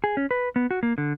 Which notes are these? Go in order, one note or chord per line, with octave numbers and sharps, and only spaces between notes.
G#4
C#4
B4
B3
F#4
A#3
D3